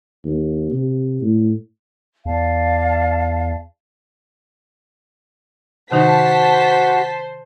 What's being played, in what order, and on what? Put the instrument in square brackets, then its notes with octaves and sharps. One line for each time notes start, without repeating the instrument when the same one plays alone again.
[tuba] D#2
C3
A2
[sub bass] E2 [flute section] D5 F5 A5
[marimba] C3 D#3 D#4 [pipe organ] F#4 [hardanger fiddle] C5 [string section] A5 B6